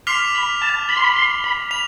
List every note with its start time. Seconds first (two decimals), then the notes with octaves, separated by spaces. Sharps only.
0.07 C6 D6 F6 B6 F7
0.35 B5
0.61 A5
0.89 B5
0.97 C6
1.04 B5
1.16 C6
1.44 B5
1.71 B5 F7